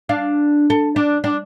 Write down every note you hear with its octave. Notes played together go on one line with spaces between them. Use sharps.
D4 F5
A4
D4
D4